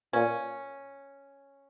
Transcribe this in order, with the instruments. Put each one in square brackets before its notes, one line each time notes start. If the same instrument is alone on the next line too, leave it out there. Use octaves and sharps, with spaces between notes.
[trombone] A#2 [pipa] C#4